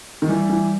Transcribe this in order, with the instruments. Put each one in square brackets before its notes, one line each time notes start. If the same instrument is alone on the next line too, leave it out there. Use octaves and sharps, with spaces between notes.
[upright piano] D#3
[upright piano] E3 [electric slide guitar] G3
[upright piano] E3